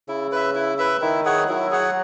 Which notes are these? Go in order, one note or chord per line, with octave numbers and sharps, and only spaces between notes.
C#3 E4
B4 E5
E4
B4 E5
D#3 E4
G#4 C#5 F#5
F#3 E4
G#4 C#5 F#5